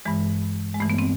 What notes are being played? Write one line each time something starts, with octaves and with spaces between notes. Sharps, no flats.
G2 E3 G#3
G#3
G2 E3 A3
B3
C4